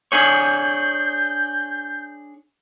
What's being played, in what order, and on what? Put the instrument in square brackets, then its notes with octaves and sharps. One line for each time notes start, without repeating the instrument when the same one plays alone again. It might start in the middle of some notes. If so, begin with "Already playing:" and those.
[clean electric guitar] D4 G#4 C#5 [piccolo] G6